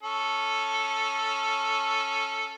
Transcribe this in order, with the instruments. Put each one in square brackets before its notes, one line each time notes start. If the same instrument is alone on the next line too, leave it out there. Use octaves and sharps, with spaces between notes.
[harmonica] C#4 A4